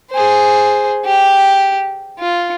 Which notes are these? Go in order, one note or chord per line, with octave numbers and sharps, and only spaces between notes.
G#4 C5
G4
F4